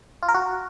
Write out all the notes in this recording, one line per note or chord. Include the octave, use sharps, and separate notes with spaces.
F4
A#4
F#4